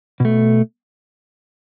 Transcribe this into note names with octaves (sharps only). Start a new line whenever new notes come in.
B2 A3